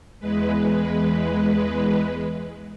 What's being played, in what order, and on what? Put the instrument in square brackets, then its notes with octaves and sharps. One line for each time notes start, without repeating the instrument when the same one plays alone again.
[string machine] E2 G#3 B4